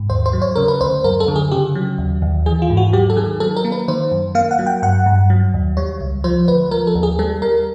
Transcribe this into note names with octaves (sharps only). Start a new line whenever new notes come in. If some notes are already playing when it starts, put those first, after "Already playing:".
Already playing: G#2
D#2 C5
C5
F#3
C#5
C#3 A#4
B4
D2 C5
F#2 A#4
A4
D3
G#4
C#3 G4
F#3
D#2
D#2
E3 G#4
F4
G#2
F#4
F#3 G4
A4
D#3 G#4
F#3 A4
A#4
A#3
B4
D#3 C5
F#2
A#3 F5
F#5
F#3
G5
G2 F#5
G2
F#3
D#2
G3 C#5
C#2
F3 C5
D2 B4
F3 A#4
A4
D#2
G#4
G3 A4
G3 A#4